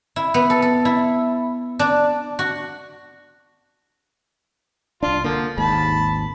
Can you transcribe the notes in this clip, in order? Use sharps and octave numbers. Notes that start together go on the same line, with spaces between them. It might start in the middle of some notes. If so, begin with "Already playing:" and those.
E4
B3
A4
A4
E4
D4
F#4
C2 D4 F4
D3 F3 A#3
G#1 D#2 G#2 A5 B5